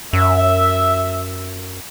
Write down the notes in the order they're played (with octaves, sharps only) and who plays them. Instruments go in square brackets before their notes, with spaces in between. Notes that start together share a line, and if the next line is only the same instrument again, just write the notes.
[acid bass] F#2 [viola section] E5